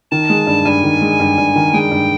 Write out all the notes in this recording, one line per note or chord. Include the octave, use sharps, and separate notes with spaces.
D#3 A5
G#3
G2
G2 G#5
D#3
G#3
G2
G2
D#3
G#3 G5
G2